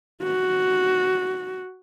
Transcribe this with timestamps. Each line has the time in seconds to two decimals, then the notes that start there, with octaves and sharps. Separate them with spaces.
0.23 F#4